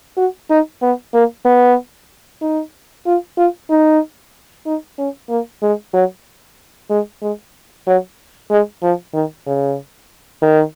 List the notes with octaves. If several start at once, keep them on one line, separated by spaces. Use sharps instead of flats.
F#4
D#4
B3
A#3
B3
D#4
F4
F4
D#4
D#4
C#4
A#3
G#3
F#3
G#3
G#3
F#3
G#3
F3
D#3
C#3
D#3